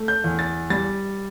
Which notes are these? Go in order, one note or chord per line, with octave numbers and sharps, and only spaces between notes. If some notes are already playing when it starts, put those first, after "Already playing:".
Already playing: A3
G6
E2
A6
G3 A6